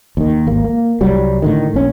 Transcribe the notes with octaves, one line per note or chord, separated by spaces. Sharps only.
D#2 D#3
G#1 A#3
A#3
C2 F#3 G3
A2 D3 D#3
A#1 C#4